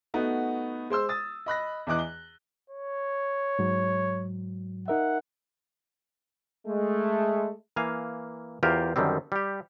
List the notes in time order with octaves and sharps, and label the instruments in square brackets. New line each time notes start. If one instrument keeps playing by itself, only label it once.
[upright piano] A3 B3 D#4 F#4
G#3 C5 C6 E6
D#6 A6
D#5 B5 F#6 A#6
E2 E3 D#5 D6 F#6
G7
[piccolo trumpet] C#5
[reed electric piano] G#2 F#3
[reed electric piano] D#4 A#4 E5 [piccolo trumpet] F#5
[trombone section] G#3 A3
[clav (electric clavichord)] E3 A#3 F5 G#5
E2 F4 G4 A#4 C5
F#2 D3 D#3 G3 C4
G3 G4